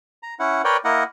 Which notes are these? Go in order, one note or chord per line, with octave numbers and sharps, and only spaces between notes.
A#5
C#4 E4 F#5
A#4 B4 C#5 D5 G5
A#3 E4 A#4 D#5 F#5